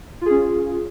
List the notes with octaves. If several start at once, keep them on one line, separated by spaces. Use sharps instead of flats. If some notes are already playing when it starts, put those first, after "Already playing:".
C#4 F4 G#4